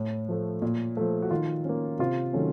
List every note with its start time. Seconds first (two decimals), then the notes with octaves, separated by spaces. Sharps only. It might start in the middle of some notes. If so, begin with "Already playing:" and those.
Already playing: A2
0.28 F3 A3
0.62 A#2
0.97 F3 A3
1.22 F#4
1.31 D#3 F4
1.65 A#3 C#4
1.99 C3 F4
2.33 D#3 F#3 A3 C#4